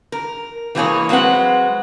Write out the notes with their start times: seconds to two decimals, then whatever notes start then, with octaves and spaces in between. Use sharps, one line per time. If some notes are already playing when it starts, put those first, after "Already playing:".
0.12 A#4
0.75 E3 G#3 A#3 B3 G#4 C#5
1.09 F#3 G#3 C4 B4 F#5